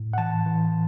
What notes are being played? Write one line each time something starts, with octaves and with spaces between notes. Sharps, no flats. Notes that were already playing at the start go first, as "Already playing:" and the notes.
Already playing: A2
F#5
E3 A5
E3